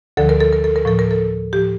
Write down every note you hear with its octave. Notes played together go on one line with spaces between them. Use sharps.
D2 D3 F3 A4
A#4
A4
A#4
A4
A#4
A2 F3 A4
A#4
A4
A2 F3 G4